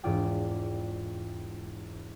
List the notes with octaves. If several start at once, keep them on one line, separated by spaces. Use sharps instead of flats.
E1 G#2 E4 F4 D5 G5